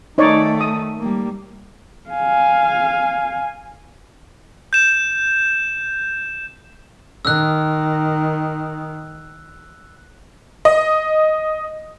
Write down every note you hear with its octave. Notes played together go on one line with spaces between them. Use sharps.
D#3 A3 D#4 C#5 D5
D#6
G3 A#3
F5 G#5
G6 E7
D#3 E6 F#6
D#5